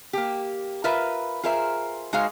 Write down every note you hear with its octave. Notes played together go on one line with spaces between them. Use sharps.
A#3 G4
F4 A#4 B4 E5
F4 G#4 A#4 C5 E5
G#3 D#4 F#4 G#4 C5 F5